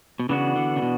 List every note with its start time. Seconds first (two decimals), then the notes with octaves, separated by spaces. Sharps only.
0.19 B2
0.29 C#3 E3 B3 D4 F#4
0.56 D3
0.76 C#3
0.82 B2